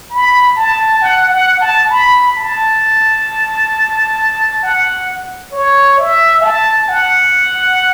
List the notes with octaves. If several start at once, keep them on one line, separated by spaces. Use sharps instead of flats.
B5
A5
F#5
F#5
A5
B5
A5
F#5
C#5
E5
A5
F#5